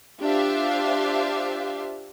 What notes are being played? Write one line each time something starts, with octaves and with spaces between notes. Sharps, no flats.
D4 F4 G4 C5 E5 F5